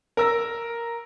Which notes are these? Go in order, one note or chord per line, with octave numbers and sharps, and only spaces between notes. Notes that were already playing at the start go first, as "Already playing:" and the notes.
A#4 E6 A#6